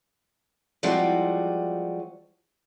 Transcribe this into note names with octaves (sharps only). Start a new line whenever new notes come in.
E3 F3 G3 G#3 C4 F#4